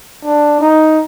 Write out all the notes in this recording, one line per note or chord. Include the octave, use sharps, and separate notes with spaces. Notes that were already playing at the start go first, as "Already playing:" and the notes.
D4
D#4